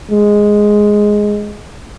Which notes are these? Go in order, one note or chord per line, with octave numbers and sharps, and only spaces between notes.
G#3